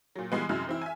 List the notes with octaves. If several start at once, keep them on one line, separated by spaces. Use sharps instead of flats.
A#2 F#3
E3 G3 G#3 B3
F#2 C3 G#3 E4 F6
E3 C4 E4
E5 G#5